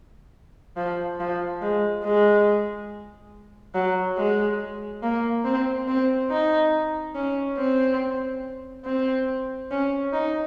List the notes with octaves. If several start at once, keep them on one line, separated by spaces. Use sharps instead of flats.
F3
F3
G#3
G#3
F#3
G#3
A#3
C4
C4
D#4
C#4
C4
C4
C#4
D#4